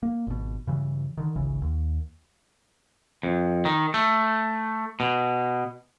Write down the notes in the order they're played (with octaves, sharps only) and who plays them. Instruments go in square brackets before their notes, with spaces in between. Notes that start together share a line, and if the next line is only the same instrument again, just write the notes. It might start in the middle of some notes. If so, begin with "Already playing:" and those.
[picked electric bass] A#3
G#1 B2
G2 C#3 E3
D3 D#3
G#1 C#2 C#3 E3
D#2
[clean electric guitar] F2
D#3
A3
B2